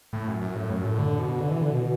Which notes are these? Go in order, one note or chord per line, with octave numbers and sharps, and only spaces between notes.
A2
F#2
F#2
A2
F#2
A2
D3
B2
D3
E3
D3
B2